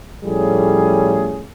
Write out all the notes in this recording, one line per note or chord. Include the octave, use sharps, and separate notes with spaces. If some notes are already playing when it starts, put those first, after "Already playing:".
A2 F3 G3 A3 C#4 G#4